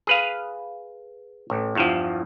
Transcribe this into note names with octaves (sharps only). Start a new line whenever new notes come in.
G#4 B4 F5
A1
E2 G2 F3